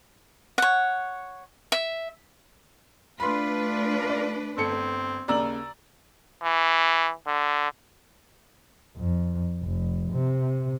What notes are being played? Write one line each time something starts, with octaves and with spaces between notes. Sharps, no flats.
C#5 F#5
E5
A3 D4 F4 B4 B5 C6
D5
G1 C4 A4 C#7
D#2 C#3 D5 A#5 E6 F#7
E3
D3
F2
F1
C3